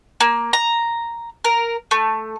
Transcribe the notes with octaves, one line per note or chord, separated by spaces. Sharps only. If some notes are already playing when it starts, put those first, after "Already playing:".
A#3
A#5
A#4
A3